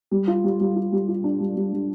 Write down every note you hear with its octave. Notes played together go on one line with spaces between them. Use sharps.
G3
F4
G3
G3
F4
G3
F4
D4
G3
G3
G3